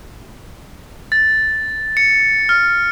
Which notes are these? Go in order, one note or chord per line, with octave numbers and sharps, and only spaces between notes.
A6
C#7
F6